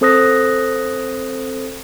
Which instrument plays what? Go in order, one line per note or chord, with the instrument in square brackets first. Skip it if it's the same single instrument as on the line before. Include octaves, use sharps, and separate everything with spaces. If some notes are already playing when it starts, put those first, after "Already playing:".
[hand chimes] C4 A4 C5 D#6 F#6 A#6